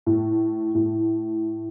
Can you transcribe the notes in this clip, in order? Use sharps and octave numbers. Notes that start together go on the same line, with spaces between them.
A2
A2